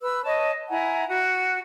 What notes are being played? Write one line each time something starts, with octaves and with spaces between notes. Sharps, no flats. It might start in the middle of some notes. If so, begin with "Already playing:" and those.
B4 E6
C#5 D#5 A5
E4 F#5 G#5 A#5
F#4